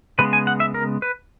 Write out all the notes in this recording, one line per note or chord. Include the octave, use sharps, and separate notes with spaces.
C#3 G#3 B3 B4
G#5
F#5
E5
A#4
B4